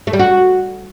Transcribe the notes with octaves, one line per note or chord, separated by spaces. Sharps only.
A3
G3
F#4